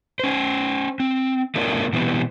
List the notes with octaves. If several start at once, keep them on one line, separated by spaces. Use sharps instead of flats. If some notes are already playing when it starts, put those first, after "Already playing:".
C#4 C5
C4
A3 B3 C#4 D4 F4 A#4
B2 E3 G3 B3 C4